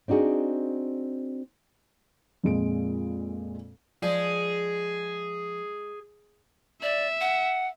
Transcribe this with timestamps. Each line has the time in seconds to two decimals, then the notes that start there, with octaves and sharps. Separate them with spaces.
0.08 C4 D4 D#4 F#4 G#4
2.43 F2 A#2 G#3 D7
4.03 F3 G#3 G#4 D5
6.82 D5 E5
7.21 F#5